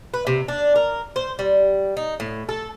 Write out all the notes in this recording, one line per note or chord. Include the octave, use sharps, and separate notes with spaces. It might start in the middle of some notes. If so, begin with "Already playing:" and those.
B4
C3
D4
A#4
C5
G3
D#4
A2
A4